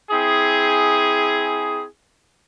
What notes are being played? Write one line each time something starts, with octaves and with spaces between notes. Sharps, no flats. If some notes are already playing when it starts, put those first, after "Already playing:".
C4 E4 G#4